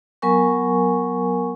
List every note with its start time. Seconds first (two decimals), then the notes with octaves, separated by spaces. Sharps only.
0.22 F#3 B3 A#4 G#5 C#6